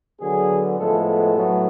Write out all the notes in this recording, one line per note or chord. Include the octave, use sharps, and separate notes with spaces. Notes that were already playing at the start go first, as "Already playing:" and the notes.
D3 F#3 B3 G#4
A2 F3 G#3 B3 A4
A4
A2 F#3 B3